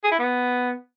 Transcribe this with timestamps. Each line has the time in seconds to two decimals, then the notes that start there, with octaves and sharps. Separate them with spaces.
0.04 G#4
0.12 E4
0.19 B3